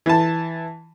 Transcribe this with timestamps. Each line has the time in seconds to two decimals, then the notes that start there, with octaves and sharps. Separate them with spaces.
0.06 E3 A5